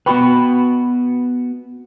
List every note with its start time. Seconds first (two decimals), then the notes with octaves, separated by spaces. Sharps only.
0.06 B3 F#4 B4 G5 B5 C#6